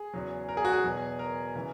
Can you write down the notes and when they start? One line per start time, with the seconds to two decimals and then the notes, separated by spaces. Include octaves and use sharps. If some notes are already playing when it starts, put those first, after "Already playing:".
Already playing: G#4
0.13 E2 C#3 F#3
0.49 A#4
0.57 G#4
0.65 F#4
0.73 G#4
0.84 E2 B2 F#3
1.19 A#4
1.55 C#3 E3